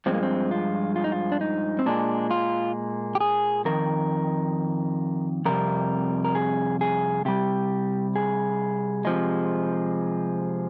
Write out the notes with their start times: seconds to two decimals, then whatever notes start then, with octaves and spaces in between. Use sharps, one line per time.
0.06 G2 F3 G#3 C4
0.14 A#3
0.23 C4
0.51 F4
0.96 F4
1.04 D#4
1.12 F4
1.32 D4
1.41 D#4
1.79 C4
1.86 A#2 G#3 D4
2.31 F4
3.15 G4
3.20 G#4
3.65 F2 D#3 A#4
5.45 F2 C3 G3 A#4
6.24 A#4
6.35 G#4
6.81 G#4
7.25 C3 G3 G4
8.15 G#4
9.05 C3 F3 G#3